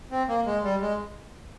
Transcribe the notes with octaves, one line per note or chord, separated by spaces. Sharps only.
C4
A#3
G#3
G3
G#3